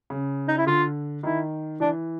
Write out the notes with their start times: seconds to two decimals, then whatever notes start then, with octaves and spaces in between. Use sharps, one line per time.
0.10 C#3
0.48 D#4
0.58 E4
0.67 D3 F4
1.23 D#3 E4
1.80 E3 D4